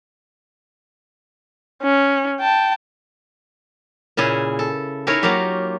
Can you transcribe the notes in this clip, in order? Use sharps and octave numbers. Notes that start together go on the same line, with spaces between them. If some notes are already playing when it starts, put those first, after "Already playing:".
C#4
G5 A5
A#2 C#3 E4 G#4
A4
D#4 E4 G#4 A#4 C#5
F#3 A#3 F4 G4